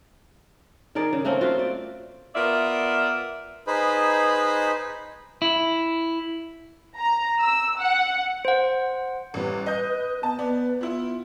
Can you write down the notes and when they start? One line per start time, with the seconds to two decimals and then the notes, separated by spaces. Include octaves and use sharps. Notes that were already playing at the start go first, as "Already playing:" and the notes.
0.95 D#3 G#4 A#4 D5
1.13 C#3
1.25 A3 A#3 C4 C#4
1.41 F4 F#4 C5 E5
1.59 D5
2.35 B3 F4 A#4 D5 E5
3.67 D#4 G#4 B4 C5 B5
5.42 E4
6.97 A#5
7.40 E6
7.77 F#5
8.45 C5 F#5
9.34 A1 G3 B4
9.66 D#5 G6
10.23 B3 A5
10.39 B3 B4 D5
10.81 B3 E4 F4